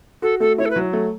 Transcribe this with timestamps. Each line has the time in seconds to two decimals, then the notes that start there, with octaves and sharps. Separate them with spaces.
0.22 F#4 A4
0.40 A3 A4
0.58 E4 C#5
0.65 A4
0.70 B4
0.76 F#3
0.93 A3